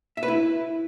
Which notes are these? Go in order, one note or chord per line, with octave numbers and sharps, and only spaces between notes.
E5
B4
E4